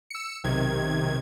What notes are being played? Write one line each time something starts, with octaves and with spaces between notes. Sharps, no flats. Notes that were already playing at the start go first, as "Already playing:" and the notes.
E6 C#7
B1 C3 D#3 G#6